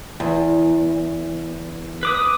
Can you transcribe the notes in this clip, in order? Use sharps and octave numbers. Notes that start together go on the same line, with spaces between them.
E2
B4 D6 D#6